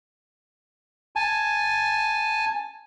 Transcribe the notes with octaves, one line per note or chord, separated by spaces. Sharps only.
G#5 A5